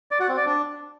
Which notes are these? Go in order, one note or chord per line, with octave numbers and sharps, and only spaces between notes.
D5
F#4
C4
D5
D4